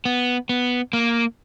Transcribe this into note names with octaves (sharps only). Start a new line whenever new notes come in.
B3
B3
A#3